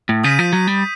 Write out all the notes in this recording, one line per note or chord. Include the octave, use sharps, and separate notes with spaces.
A2
C#3 D#6 G6 B6 D#7
F3
F#3
G3